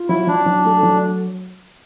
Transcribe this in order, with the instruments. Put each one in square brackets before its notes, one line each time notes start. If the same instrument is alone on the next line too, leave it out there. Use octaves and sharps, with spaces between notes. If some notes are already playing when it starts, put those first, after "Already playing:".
Already playing: [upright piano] F4
[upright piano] F#3 [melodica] E4
[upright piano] F#3 [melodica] D4
[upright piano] F#3
A3
F#3